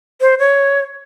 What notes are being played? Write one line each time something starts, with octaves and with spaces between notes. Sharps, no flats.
C5
C#5